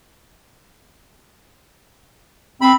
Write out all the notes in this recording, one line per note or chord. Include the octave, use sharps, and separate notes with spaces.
C4 B5